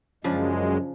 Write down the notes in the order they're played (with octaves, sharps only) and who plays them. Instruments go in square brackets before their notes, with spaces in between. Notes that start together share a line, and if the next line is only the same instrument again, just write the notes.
[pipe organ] F#2 G#3 [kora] C#3 F3 D4